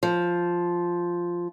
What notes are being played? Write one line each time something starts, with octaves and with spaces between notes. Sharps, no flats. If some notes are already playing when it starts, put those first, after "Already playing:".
F3